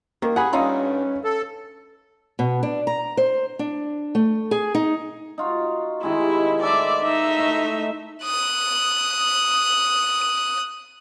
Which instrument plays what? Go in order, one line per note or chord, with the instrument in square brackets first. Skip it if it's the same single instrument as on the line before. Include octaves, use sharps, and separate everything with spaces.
[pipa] D#3 [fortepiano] A#3
[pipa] G#4 [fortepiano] F#5 G#5 B5
[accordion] G2 [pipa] A3 D#4 F4 [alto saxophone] C#4
[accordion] A4
[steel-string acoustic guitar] B2
D4
A#5
C5
D4
A3
G#4
D#4
[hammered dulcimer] D#4 F4 F#4
[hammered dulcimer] C3 D#3 G#3 [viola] E4
[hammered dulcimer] A4 B4 C5 [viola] D5 E5
[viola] D#4 E5
[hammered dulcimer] A2 A3
[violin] D#6 F#6